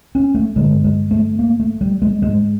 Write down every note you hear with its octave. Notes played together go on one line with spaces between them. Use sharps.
C#4
A3
G2 D3 G#3
G#3
A3
A#3
A3
G3
G#3
G#2 G#3